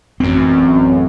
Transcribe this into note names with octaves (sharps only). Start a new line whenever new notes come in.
A1 F#2 C4